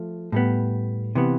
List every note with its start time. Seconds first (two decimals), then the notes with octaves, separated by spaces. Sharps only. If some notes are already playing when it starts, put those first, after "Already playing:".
Already playing: F3 A3
0.32 A2 G3 B3
1.15 C3 E3 B3